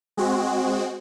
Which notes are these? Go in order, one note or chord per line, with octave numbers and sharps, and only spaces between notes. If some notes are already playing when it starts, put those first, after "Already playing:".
G#3 C4 F#4